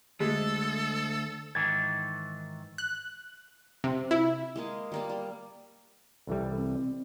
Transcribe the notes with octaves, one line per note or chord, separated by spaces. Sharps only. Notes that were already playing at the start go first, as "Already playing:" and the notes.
D2 G#3 A4
G#2 D#3 E3 G#6 A6
F#6
C3
E4
G#3 A#3 G#4
G3 A#3 D5
G3
C2 E3 G3 A4
C4